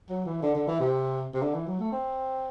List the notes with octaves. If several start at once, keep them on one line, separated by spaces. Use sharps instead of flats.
F#3
E3
D3
D3
E3
C3
C3
D3
E3
F#3
A3
C4